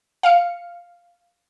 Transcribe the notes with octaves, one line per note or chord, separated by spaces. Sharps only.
F5 C#7